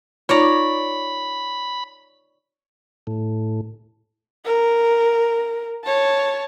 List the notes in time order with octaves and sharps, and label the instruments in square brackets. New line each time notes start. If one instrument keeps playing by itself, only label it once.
[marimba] D#4 F4 [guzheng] C#5 D5 A#5 [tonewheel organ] B5
[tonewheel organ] A2
[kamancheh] A#4
C#5 A5